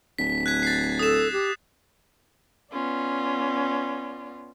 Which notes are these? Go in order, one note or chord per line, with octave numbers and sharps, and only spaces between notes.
D1 B6
F#6 G#6 B6
A6 C7
A4 D#6 E7
G4
B3 C#4 F4 D5